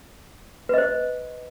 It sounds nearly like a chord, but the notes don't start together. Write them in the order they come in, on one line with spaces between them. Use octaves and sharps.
B4 D#5 C5